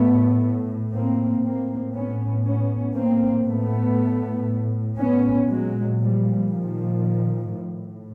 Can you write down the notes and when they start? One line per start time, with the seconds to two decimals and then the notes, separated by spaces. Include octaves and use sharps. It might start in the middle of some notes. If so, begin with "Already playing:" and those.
Already playing: A2 A3 B3
0.93 A#3 C4
1.43 A2 A#3 C4
1.95 B3 C#4
2.45 B3 C#4
2.96 A#3 C4
3.47 A2 A3 B3
4.99 B3 C#4
5.50 A#2 F#3 G#3
6.01 F3 G3
6.52 D#3 F3
7.53 A2